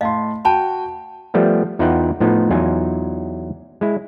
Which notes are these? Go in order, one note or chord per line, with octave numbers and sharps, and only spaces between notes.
A2 D#5 F5 A5 C6
F#4 G5 A5 B5
F3 G3 A3 B3
E2 D#4 F4 B4 F#5 G5
A2 F3 B3 D#4 F4
E2 F#3 D#4 F4 G#5
G#3 E4